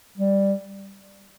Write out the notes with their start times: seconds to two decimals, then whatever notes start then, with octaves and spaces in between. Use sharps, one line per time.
0.18 G3